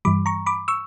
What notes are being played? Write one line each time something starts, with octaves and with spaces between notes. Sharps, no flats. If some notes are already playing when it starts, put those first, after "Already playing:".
G2 E3 G3 B5 D6
A#5 C#6
B5 D6
C#6 E6